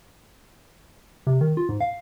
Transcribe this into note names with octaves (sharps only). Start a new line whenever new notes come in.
C3
D#3
F4
G#2
F5